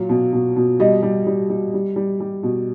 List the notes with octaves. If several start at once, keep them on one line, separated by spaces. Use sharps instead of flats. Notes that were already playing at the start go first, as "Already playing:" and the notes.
Already playing: A#2 F#3
B2
B2
B2
G3 D#5
G3
G3
G3
G3
G3
G3
B2